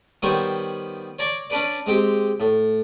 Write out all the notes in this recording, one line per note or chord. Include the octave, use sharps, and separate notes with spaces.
D#3 G3 B3 C5 C#5 C#6
C#5 D5 A#5 C#6 D6
C#4 D4 B4 D5
G#3 C4 G4
A2